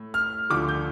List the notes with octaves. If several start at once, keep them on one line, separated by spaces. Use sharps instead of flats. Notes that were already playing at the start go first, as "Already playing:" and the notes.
Already playing: A2
F6
D2 D3 F3 D6
G6